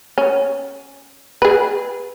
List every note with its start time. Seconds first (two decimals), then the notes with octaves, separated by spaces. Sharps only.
0.18 C#4
1.42 G#4 B4